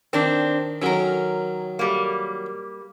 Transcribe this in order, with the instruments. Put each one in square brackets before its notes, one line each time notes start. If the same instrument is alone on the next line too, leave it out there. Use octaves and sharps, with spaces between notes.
[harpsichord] D#3 [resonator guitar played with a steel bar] C4 D4
[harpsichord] D#3 F#3 [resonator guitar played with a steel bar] C#4 A#4
[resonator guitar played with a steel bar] G3 A#3